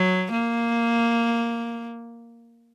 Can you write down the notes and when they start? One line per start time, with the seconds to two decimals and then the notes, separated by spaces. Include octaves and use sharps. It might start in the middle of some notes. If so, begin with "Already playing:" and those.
Already playing: F#3
0.32 A#3